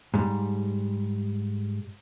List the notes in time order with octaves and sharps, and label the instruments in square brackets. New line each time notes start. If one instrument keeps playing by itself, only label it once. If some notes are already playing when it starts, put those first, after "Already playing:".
[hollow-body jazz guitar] G#2 G3